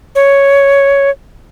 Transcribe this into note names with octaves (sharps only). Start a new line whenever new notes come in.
C#5